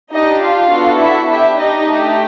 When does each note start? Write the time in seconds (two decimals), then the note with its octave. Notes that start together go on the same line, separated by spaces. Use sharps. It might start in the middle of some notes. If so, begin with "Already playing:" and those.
0.13 D4 D#4 G4 D#5
0.42 F4 F5
0.71 B3 D4 F#4 A4
1.00 E4 E5
1.29 D4 E4 G4 E5
1.59 D#4 D#5
1.88 A3 D4 G4